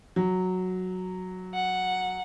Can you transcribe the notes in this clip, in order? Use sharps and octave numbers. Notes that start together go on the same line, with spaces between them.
F#3
F#5